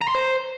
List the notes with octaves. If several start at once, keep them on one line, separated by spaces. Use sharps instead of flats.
A#5
C6
C5